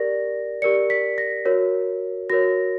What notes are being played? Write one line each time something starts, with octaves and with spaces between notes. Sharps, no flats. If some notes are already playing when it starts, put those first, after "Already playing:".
Already playing: G4 A#4 D5 A#6
G4 A#4 D5 C#7
B6
A#6
F#4 A#4 C#5
F#4 A#4 C#5 A#6